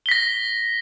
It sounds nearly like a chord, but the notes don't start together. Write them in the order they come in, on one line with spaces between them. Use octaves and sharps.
G7 B6 A#6